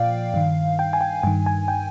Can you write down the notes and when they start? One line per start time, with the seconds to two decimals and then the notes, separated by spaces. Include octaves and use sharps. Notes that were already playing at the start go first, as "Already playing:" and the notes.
Already playing: A#2 F3 D5 F5 G5
0.34 G2 D#3
0.79 G5
0.93 G#5
1.01 G5
1.23 G2 D#3 G#5
1.46 G#5
1.68 G5